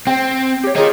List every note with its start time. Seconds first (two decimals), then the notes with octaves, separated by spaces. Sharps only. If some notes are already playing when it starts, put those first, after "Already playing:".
0.07 C4 C5 G5
0.63 G4 C#5
0.76 D#4 F4 G#4 A#4 C#5